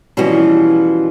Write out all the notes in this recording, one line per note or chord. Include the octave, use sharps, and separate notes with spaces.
B2 E3 F3 G3 C#4 F#4